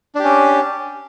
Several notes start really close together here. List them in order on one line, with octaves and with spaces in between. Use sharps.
D4 G4 C#4